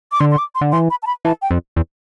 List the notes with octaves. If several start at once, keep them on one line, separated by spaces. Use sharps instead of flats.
D6
D3 C6
C6
D6
C6
D3
E3 C6
B5
A5
B5
E3 A5
G5
F2
E2